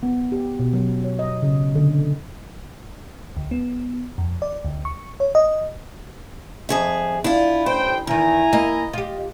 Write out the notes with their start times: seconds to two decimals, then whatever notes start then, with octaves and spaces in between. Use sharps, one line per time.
0.03 B3
0.32 G4
0.59 B2
0.73 F#3
1.04 C#5
1.19 D#5
1.42 C#3
1.75 D3
3.37 D2
3.51 B3
4.18 F2
4.42 D5
4.65 D2
4.85 C#6
5.20 C#5
5.35 D#5
6.69 F2 G#4 E5
7.24 D4 E4 F4
7.66 A1 C5 G5
8.07 E2 D#3 E4 A#4 G#5 A#5
8.53 A#3 D#5
8.93 F4 G4